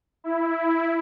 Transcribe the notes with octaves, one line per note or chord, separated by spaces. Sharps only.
E4